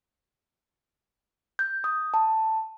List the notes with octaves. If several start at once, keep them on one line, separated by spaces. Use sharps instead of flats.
G6
D#6
A5